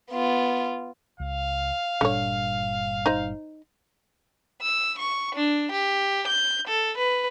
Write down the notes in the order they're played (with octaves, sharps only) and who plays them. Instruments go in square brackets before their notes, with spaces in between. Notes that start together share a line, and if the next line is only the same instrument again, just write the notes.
[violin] B3 F4
[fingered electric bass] C#2 [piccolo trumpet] F5
[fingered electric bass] G1 A#2 G3 [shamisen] D3 C#5
[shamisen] D#4 C5
[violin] E6
C#6
D4
G4
G6
A4
B4